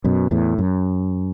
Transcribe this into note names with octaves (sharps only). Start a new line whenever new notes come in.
F#2 B2
E2 A2
F#2